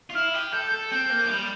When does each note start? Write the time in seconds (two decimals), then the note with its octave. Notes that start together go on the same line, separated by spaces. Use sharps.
0.10 F4
0.15 E4 F6
0.34 G4
0.52 A4 G6
0.67 G6
0.72 A4
0.91 C4 G6
1.09 A#3
1.25 F3
1.29 G3